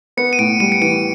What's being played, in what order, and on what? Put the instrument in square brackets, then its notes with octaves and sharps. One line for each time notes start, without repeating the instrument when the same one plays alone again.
[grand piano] B3 [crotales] C#7
[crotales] D#7
[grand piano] A2 [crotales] D7
[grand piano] G3 [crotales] D#7
[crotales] C#7
[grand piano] E3 [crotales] D7